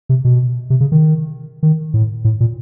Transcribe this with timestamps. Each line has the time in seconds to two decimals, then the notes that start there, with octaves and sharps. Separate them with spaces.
0.09 C3
0.25 B2
0.70 C3
0.81 C#3
0.92 D#3
1.63 D#3
1.94 A2
2.25 A2
2.40 A#2